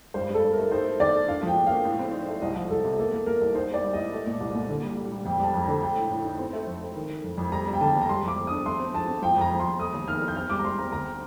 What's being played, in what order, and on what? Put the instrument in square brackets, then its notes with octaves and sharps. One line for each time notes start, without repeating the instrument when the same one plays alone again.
[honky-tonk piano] G2 [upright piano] C5
[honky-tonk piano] G2
[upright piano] A4
[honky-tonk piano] G2
[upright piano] A#4
[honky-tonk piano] A3
[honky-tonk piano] D#4 [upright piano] C5
[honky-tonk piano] A3
[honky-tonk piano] D#3 [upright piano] D5
[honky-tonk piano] A3
[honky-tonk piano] D4 [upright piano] F5
[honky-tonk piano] F3 [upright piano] G5
[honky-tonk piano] A2
[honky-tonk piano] A#3 [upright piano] F5
[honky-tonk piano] A2
C4
D#4
A3
[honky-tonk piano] C2 [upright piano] D#5
[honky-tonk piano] F3
[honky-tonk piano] C2 [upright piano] A4
[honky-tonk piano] C3
[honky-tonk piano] A#3 [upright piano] A4
[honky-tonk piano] A#3
[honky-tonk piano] A#3 [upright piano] A#4
[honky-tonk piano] C2
[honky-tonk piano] D#4 [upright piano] C5
[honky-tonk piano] A#3 [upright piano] D5
[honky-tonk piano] G3
[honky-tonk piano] A2 [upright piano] D#5
[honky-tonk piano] A3
A#2
C2
A#2
D3
G3
G3
G3
[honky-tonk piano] F2 [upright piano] G5
[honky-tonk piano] G3 [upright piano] A5
[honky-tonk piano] F2
[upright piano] A#5
[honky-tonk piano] D3
[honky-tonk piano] A3 [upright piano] G5
[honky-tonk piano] A2
A2
D#4
C4
A3
F2
A3
D#3
D#3
F2
F2
[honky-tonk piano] G3 [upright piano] A#5
[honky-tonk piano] G3
[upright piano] G5
[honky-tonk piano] D3 [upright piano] A5
[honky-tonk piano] D#2
[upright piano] A#5
[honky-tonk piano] G3 [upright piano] C6
[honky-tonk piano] F2 [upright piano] D6
[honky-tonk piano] F2
[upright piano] D#6
[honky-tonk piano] D4
[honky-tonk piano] A3 [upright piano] C6
[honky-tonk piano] C4
[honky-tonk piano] F3 [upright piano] A5
[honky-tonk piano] C4
[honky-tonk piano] F3 [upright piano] G5
[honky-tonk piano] F2 [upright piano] A#5
[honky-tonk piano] F3
[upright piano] C6
[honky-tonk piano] F2
[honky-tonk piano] A3 [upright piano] D#6
[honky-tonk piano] D#2
[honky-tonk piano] D#3 [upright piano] F6
[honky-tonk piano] D#4
[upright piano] G6
[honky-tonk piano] C4 [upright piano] F6
[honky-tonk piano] G3 [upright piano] D6
[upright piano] A#5
[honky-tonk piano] G3 [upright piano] C6
[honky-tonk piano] C4 [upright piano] A#5
[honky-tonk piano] D2 [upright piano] A#5